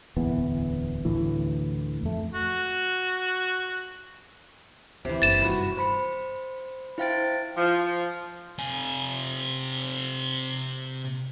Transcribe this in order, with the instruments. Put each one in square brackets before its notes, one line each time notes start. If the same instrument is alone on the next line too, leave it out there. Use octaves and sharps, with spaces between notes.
[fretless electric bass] D1 E2 E3 B3
D2 A2 E3
F2 A3
[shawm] F#4
[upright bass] D2 [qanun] C3 E3
[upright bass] F#1 [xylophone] A6 E7
[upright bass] G2 D#3 [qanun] F#4 B4
[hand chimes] C5 B5 C#7
E4 C5 F5 G5 A6 D7
[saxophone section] F3
[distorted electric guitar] C3 G#5